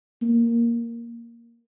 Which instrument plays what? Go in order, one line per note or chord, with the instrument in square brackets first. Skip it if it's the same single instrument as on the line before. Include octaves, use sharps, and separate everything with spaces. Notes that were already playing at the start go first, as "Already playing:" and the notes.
[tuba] A#3